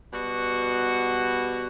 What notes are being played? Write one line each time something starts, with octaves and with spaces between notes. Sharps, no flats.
B2 G3 B3 F#4